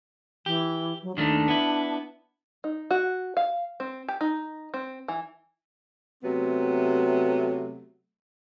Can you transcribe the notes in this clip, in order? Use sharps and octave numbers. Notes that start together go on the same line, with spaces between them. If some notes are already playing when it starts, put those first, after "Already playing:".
E3 G4
F#3
D#2 D#3 A3 D4
B3 E4
D#4
F#4
F5
C4
G4
D#4
C4
E3
C3 F#3 A3 B3 C4